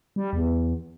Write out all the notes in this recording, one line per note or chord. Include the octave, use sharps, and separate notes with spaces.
G3
E2